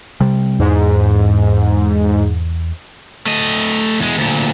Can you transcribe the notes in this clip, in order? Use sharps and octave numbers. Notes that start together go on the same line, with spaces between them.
C3 G3
E2 G#2
A3 D#5
E2 G#3
D2 A#2